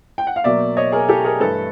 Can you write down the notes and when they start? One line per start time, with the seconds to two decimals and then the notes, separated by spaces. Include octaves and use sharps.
0.18 G5
0.27 F#5
0.36 F5
0.44 B2 F#3 A#3 D5 E5
0.77 C#5 D#5
0.92 G#4 A#4
1.09 G4 A4
1.25 G#4 A#4
1.40 G2 E3 A3 A4 B4